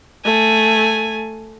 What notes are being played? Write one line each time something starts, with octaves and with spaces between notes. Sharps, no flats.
A3 G#5